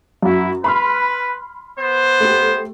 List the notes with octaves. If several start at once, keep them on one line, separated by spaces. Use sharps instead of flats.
F#2 E4 F#4
B4 B5 C6 F6
B3 C5
A3 G4